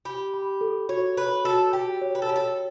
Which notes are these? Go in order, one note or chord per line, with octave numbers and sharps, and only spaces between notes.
G4 B5
B5
A4
F#4 C#5
B4 C#5
F#4 A4
G4 G5
C#5
B4
A4
G4 C#5
A4